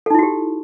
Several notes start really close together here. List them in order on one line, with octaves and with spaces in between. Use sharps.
A4 D#4 E4 F#4 G4